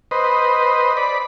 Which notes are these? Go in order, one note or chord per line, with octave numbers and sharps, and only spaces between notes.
B4 C5 D#5
D5 B5